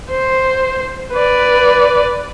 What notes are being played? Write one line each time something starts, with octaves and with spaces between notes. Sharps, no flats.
C5
B4 D5